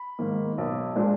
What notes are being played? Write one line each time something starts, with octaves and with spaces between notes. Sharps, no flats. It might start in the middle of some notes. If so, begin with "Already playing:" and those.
Already playing: B5
G#2 D#3 A#3
B1
A#2 G#3 D4